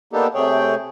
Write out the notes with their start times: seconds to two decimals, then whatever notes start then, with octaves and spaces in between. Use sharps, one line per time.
0.13 A#3 B3 D4 D#4 G4 A4
0.35 C3 A3 G#4 C#5 G5